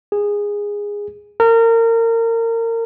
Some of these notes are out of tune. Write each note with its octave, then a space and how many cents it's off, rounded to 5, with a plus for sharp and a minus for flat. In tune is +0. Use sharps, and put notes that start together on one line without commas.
G#4 -15
A#4 -30